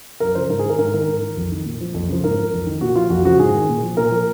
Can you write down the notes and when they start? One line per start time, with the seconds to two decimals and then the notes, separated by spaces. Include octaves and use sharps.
0.20 F#2 A#4
0.35 C#3 F3 C5
0.49 G#2 A#4
0.59 G#4
0.65 D#3 A#4
0.78 G#2 A#4
0.94 D#3 A#4
1.08 G#2
1.22 D#3
1.37 F2
1.52 D#3
1.66 A#2
1.81 F3
1.94 F2
2.09 C#3 F3
2.24 G#2 A#4
2.38 F3
2.53 F2
2.67 D#3
2.81 A#2 F#4
2.95 F3 F4
3.10 F2 F#4
3.25 C#3 F3 F#4
3.39 G#2 G#4
3.54 D#3
3.69 A#2
3.83 F3
3.97 A#2 A#4
4.11 F3